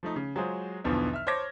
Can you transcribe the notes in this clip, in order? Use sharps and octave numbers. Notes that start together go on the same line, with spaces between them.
F3 A3 D#4
C#3
F#3 G#3 F4 G#4 C5
B1 E2 B2 D3 E3 F3
E5 F6
C5 C#5 A5 D6 G#6 A#6